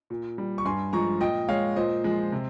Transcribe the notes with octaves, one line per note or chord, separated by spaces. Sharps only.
A#2
G3
C#6
G2 G#5 C6
F3 G#3 A#5 C#6
A#2 D#5 G5
G#3 C#5 F5
A#2 C5 D#5
F3 G#3
C3